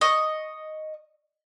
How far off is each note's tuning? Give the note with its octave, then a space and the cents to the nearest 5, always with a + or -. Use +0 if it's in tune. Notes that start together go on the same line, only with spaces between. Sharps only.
D#5 +0 C#6 +0